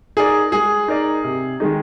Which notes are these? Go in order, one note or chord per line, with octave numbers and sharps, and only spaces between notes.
D#4 G#4 A#4 D5
G#3 G#4
D#4 A#4 D5
C3
D#3 G#3 D#4